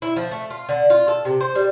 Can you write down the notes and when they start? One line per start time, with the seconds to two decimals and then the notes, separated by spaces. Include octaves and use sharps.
0.02 E4
0.16 F3
0.31 A3
0.50 F4
0.69 D3
0.90 F4
1.08 A4
1.25 C3
1.40 C5
1.55 G3